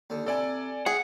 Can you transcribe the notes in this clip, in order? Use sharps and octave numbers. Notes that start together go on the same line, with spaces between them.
D#2 D3
C3 E4 A4 D5 G#5
G#4 E5 F#5